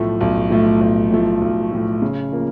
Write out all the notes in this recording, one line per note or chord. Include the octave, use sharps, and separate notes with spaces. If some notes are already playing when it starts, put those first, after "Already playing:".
Already playing: B1 A2 F3 A3
B1
A2 F3 A3
B1
A2 F3 A3
B1
A2 F3 A3
C#3
F3 A#3